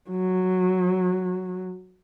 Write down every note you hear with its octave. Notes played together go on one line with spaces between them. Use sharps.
F#3